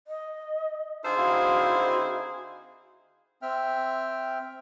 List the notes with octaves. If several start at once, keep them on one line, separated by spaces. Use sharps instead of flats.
D#5
D3 D#4 F4 G#4 A4 C5
C4 D#4 E4 F#4 F5
C4 E5 G5 F6